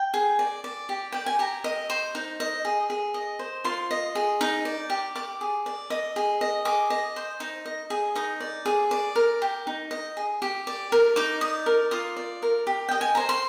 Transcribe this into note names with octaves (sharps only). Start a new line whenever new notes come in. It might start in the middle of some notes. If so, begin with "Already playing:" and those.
Already playing: G5
G#4
D5
D5
G4
D5 G5
G#5
G4 A#5
D#5
C5
D#4
D#5
G#4
G#4
D#5
C5
F4 C6
D#5
G#4
D#4
D5
G4
D5 D6
G#4
D5
D#5
G#4
D#5
G#4 D6
D#5
C5
D#4
D#5
G#4
D#4 D#6
D5
G#4
D5
A#4
G4
D#4
D#5
G#4
G4
D5
A#4
D#4 D6
D5 D#6
A#4
F4 D#6
D5
A#4
G4
D#5 G5
G#5
C5 A#5
C6